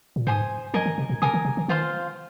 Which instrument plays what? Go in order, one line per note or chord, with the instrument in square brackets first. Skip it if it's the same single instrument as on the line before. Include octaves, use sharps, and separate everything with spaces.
[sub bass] A#2
[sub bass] G#2 [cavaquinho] C5 G#5 D#6
[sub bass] F3 [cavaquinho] A#4 D#5 G#5
[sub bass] D#3
C3
A#2
[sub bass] C3 [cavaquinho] A#4 G#5 D#6
[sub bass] D#3
C3
D#3
[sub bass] D#3 [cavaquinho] F4 C5 F5 C6